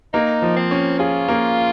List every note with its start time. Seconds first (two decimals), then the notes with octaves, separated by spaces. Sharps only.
0.13 A#3 D#4
0.42 F3
0.56 C4
0.71 C#4
0.99 F4 G#4
1.28 A#3